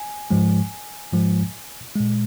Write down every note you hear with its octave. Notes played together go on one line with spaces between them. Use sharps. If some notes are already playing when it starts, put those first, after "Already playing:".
Already playing: G#5
G#2 F3 G#3
G#2 F3 G#3
A#2 G#3